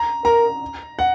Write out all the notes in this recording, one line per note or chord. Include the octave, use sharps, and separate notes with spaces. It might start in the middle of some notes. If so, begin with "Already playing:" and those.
Already playing: A#5
A#4 A#5
F#5